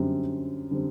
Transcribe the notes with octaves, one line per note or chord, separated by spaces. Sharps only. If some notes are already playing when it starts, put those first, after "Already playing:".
Already playing: F#2 D3 G3 C4
D3 G3 C4